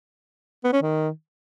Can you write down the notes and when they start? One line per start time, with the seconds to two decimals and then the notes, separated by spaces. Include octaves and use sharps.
0.64 B3
0.73 C#4
0.82 D#3